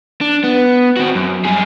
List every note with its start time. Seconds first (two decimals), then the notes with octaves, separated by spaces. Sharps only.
0.21 D4
0.44 B3
0.96 C4 F#4
1.15 F#2
1.45 G3 G#4